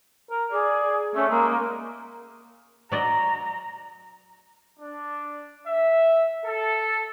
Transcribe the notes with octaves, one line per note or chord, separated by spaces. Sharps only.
A#4
G#4 D5
A3 C#4
G#3 A#3
F#3 D5 D#5 A#5
D4
E5
A4